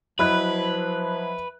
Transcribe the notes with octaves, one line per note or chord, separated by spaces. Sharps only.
F3 F#3 E4 B4 D#5 E5 B5 F#6